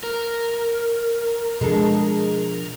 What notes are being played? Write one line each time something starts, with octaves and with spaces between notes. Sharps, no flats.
A#4
B2 F3 G#3 D4 A4